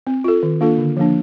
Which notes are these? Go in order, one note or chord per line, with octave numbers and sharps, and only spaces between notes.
C4
F4 A4
D#3
A#3 D4 F4 A4
D3
F3 A#3 D4